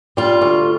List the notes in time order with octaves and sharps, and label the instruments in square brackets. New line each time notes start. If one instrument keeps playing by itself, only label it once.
[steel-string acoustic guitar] G3 F4
D2